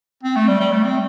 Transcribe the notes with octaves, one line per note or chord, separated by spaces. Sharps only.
C4
A3
G3
G3
A3
C4